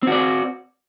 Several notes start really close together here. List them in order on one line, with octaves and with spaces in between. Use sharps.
C4 F#4 D5